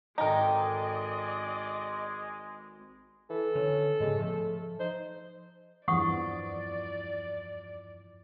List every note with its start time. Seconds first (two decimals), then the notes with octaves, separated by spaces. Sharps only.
0.18 G#1 G#3 D#4 A4 A#4 D5 D#5 G5
3.30 E3 A4
3.55 D3 C#4
4.00 G#2 C#3 G#3 B3
4.19 F3 A3
4.80 D#4 C5
5.88 E2 G2 E3 F3 D5 F#5 C#6 D#6